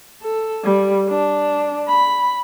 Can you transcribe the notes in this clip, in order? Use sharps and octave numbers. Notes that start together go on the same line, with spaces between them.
A4
G3
D4
B5